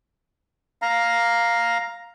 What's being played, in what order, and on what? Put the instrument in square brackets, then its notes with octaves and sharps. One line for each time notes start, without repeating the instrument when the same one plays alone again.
[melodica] F5 A#5